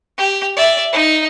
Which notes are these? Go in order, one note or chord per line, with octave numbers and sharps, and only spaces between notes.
G4
D5 E5
D#4